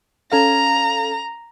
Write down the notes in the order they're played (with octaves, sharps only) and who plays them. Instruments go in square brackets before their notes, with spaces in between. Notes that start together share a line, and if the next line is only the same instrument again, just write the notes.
[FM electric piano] C#4 A4 F5 [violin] A#5